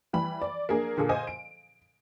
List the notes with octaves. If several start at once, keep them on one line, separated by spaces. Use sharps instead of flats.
E3 G3 B5
D5
A#3 D4 G#4 A#4
A#2 D3 G#4 A4
C5 D#5 G#5
D7